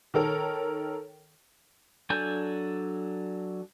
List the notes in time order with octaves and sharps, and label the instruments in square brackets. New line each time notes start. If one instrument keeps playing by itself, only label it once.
[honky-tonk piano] D#3 A4 A#4 C#5
[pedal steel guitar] F#3 D4 A4 G#5 G6